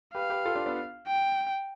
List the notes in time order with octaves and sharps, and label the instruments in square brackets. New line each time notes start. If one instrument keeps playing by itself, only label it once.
[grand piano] G4 B4 [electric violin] F5
[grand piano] G4 B4
F4 A4
D4 F4
B3 D4
[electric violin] G5